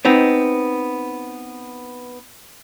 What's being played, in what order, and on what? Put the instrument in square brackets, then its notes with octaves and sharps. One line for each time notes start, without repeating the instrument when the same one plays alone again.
[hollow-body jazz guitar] B3 C4 D#4